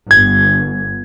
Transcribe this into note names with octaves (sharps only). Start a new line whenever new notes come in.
G1 G#6